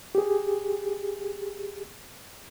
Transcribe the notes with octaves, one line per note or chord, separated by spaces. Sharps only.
G4 G#4